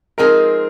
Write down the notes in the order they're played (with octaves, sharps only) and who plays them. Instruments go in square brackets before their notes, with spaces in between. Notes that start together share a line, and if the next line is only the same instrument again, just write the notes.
[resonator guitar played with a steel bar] F3 G#3 C4 D#4 G#4 [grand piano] A#4